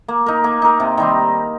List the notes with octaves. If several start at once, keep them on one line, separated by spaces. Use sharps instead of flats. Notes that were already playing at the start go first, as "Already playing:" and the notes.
A#3
D#4 A#4
A#3
D#4 A#4
C3
D#3 G3 C4